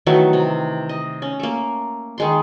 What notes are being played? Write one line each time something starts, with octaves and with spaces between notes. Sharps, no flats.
D#3 E3 F#3 A3
C3
D#5
C#4
A3 A#3
D#3 G#3 C6